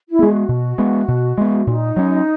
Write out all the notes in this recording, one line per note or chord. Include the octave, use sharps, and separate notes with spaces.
E4
G#3 B3 G#4
F#4
B2
G#3 B3
B2
G#3 B3
A#2 D#4
F#3 C#4